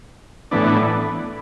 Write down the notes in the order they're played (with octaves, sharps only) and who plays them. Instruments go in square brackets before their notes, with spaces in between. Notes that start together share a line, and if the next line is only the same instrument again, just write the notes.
[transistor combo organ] A2 E3 B3 D4